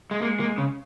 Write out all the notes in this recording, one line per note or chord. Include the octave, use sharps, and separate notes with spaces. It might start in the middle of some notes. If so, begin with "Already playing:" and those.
G#3
G#3 A#3
A#3
C#3